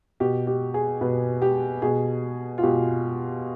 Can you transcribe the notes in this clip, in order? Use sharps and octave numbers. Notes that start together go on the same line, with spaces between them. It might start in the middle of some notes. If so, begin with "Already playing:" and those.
B2 G4
G4
G#4
B2 B4
G4
B2 G#4
F4
B2 G4